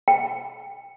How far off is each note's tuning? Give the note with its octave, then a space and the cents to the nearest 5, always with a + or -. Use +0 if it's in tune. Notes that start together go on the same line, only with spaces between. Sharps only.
G5 +15